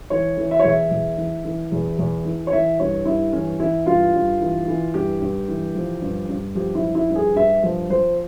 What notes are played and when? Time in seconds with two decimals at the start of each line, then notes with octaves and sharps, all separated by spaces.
0.10 E3 C#5
0.37 E3
0.51 E5
0.59 C#5
0.64 E2 E5
0.91 E2
1.17 E3
1.45 E3
1.72 E2
1.99 E2
2.25 E3
2.47 C#5
2.52 E3 E5
2.80 G2 C#5
3.05 G2 E4
3.33 E3 C#4
3.60 E3 E4
3.86 G2 F4
4.14 G2
4.40 E3
4.67 E3
4.94 G2 G4
5.21 G2
5.48 E3
5.75 F3
6.02 G2
6.29 G2
6.55 F3 G4
6.75 E4
6.82 F3
6.95 E4
7.09 G2
7.15 G#4
7.35 G2 E5
7.63 F3
7.90 F3 C5